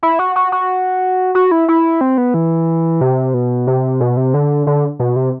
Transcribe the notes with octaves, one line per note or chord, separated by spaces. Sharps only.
E4
F#4
F#4
F#4
F#4
E4
E4
C4
B3
E3
C3
B2
C3
B2
C3
D3
D3
B2
C3